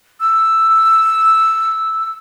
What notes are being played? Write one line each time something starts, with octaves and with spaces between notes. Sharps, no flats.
E6